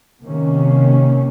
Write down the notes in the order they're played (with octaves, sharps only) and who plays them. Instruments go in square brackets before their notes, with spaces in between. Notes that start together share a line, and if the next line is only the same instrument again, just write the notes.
[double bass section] C3 D#3 A#3 C#4